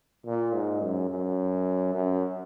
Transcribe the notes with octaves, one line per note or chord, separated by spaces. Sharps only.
A#2
G#2
F#2
F#2
F#2